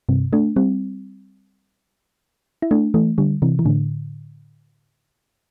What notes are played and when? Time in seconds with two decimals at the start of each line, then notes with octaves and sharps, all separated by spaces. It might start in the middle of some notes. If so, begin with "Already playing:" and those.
0.09 G2 C3
0.33 A3 D4
0.56 G3 C4
2.62 E4
2.71 A3 D4
2.94 E3 A3
3.18 D3 G3
3.42 C3 E3
3.59 E3
3.65 A2 D3